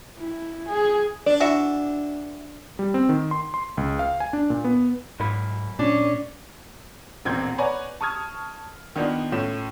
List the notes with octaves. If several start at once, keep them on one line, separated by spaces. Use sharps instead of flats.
E4
G#4
D4 D5
E3 F#4 E5
G3
C4
D#3
C6
C6
C#2
F5
G#5
D4
A#2
B3
G#2 F#3 A#4 B5
A#2 C#4 D4
E1 A1 A#2 C4 G6 G#6
B4 C#5 D5 F#5 G#5 A#5
A5 C#6 D#6 F6 G#6
D#3 A#3 B3 D4 D#4 F4
A2 C#4 F4 E7